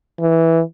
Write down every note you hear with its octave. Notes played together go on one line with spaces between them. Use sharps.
E3